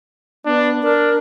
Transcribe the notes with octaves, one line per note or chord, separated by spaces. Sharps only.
B3 D4
D4 A#4